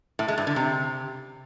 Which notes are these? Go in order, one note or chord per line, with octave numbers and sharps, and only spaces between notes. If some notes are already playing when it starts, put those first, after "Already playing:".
A2
G#3
G2
D3
C3